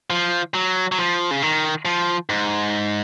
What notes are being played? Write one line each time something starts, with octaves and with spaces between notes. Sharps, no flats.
F3
F#3
F#3
F3
C#3
D#3
F3
G#2